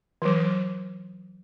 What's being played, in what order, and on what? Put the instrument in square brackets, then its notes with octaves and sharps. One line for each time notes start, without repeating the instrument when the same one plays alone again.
[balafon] E3 F#3